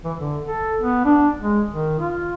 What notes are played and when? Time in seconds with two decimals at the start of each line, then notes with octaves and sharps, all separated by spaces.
0.04 E3
0.18 D3
0.47 A4
0.81 B3
1.05 D4
1.41 G#3
1.69 D#3
2.00 F4